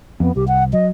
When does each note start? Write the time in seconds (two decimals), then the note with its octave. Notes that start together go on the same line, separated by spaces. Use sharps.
0.20 F2 B3
0.36 C2 G4
0.48 F#5
0.73 F#3 D#5